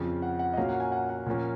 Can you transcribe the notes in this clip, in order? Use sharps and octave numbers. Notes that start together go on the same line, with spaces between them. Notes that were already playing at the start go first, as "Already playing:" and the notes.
Already playing: F2 C#3 F3
F#5
F#5
D#5
A#2 F#3 A#3 C#4 F5
F#5
G#5
F#5
F#5
A#2 F3 A#3 C#4